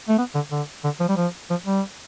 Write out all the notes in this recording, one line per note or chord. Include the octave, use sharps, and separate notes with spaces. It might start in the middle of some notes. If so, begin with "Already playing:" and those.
A3
B3
D3
D3
D3
F3
G3
F3
F3
G3